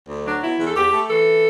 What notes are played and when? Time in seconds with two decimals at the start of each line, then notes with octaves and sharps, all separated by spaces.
0.09 D2
0.26 F#3 D4
0.42 B2 E4
0.59 E2
0.65 A4
0.76 E2 G4
0.92 A3
1.10 E3 A4